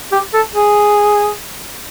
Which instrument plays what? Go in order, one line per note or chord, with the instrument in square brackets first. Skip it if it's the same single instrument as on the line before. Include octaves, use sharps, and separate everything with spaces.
[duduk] G4
A4
G#4